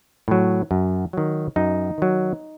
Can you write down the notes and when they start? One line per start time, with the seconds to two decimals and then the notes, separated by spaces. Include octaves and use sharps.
0.28 A2 F#3
0.71 F#2
1.13 D#3 F#3
1.56 F#2 D#4
1.98 D#3 F#3